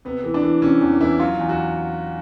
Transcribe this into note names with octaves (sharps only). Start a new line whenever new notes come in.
C3 B3
E3
D4
E3
C3 C#4
E2
E3 E4
F#3 F4
E2
F#4